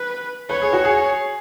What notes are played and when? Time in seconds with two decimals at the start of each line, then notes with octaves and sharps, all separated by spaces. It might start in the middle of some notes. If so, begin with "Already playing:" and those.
Already playing: B4
0.49 B4 C#5
0.62 G#4
0.73 F#4
0.85 G#4